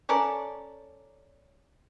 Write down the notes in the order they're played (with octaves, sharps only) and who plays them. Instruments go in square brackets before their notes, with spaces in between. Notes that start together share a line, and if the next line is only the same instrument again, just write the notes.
[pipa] C#4 A4 A#4 D5